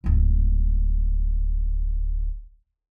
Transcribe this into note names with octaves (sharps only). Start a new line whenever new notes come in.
D1 G#1